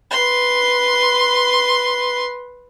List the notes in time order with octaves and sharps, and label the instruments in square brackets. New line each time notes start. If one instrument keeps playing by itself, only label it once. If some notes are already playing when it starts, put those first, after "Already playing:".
[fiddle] B4 C6